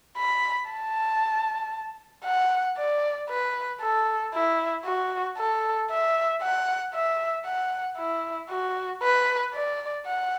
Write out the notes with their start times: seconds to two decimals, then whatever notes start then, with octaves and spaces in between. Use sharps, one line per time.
0.18 B5
0.70 A5
2.25 F#5
2.78 D5
3.30 B4
3.82 A4
4.34 E4
4.85 F#4
5.38 A4
5.91 E5
6.42 F#5
6.94 E5
7.46 F#5
7.98 E4
8.50 F#4
9.03 B4
9.54 D5
10.06 F#5